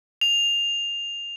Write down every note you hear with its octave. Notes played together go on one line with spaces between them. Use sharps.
F7